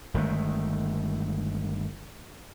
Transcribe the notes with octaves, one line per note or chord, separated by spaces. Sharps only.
G1 D#3 G#3 A3